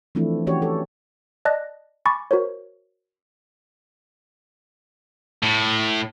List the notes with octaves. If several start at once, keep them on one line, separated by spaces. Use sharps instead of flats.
E3 F3 A3 C4 D4 E4
E3 C#4 F#4 G4 C#5 D5
A4
D5 D#5 A5 F#6 A#6
G#5 B5 C#6 D6 A6
F#4 A#4 C5 C#5
A2